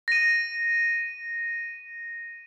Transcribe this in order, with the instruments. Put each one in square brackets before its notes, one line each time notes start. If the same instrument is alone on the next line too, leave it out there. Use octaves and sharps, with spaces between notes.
[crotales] A#6 D#7